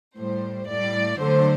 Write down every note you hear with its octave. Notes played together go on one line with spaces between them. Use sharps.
A2 G3 C5
A2 G3 D5
D3 F#3 A3 C5